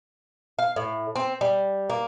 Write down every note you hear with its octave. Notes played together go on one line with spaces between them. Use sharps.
F5
A2
C4
G3
A#3